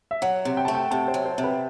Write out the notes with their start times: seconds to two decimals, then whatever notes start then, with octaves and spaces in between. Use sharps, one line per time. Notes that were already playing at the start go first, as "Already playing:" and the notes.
0.11 E5
0.22 F#3 F#5
0.45 C3
0.57 G5
0.65 A3 A5
0.75 G5
0.91 C3 A5
1.08 C5
1.14 F#3
1.25 C5
1.38 C3
1.44 B4